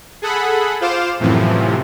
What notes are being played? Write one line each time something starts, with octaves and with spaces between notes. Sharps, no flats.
G#4 A4 F#5 B5
F4 C5 F5 D6 E7
F#2 A2 C3 E3 F3